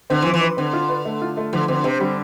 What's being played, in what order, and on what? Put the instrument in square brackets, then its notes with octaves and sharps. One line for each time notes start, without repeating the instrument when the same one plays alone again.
[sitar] D3 [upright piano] C4
[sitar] E3
[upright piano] F3
[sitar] E3
[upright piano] B4
[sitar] D3 [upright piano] C4
[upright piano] F4
B4
A3
F4
A3
[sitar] D3 [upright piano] F3
[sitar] D3 [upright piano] C4
[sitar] C3 [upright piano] C4
[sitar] D3 [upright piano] G3